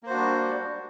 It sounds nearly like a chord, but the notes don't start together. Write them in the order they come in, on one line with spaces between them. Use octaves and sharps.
A#3 C5 F#4 D4 G3